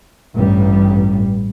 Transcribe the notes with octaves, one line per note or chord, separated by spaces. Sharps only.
A1 G2 G3